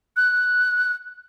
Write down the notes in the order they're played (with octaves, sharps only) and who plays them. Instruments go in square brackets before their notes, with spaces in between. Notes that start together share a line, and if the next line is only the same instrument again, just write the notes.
[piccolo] F#6